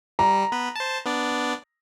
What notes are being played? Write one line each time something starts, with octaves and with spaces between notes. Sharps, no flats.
G3 A#5
B3 B4
C5 A5
B3 D4 D5